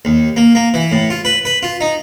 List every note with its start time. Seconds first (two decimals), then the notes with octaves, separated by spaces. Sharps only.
0.05 D#2
0.36 A#3
0.55 A#3
0.74 E3
0.92 A2
1.10 F4
1.25 B4
1.45 B4
1.63 F4
1.81 D#4